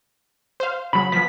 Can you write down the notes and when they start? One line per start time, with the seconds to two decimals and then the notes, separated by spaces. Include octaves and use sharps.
0.60 C5 F5
0.93 C#3 F#3 B5
1.12 F3 B3 B6